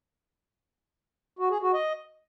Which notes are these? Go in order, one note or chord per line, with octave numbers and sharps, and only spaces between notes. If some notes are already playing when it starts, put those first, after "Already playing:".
F#4
G#4
F#4
D#5